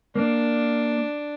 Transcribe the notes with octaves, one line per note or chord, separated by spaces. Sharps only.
A#3 D4